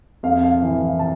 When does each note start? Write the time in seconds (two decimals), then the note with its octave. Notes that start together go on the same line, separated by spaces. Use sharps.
0.23 F2 F5
0.43 F5
0.62 E3
0.82 F5
0.99 A5